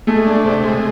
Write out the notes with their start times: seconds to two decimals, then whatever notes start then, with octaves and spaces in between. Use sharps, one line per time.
0.07 G#3 A3
0.26 D4
0.45 C3
0.63 G#3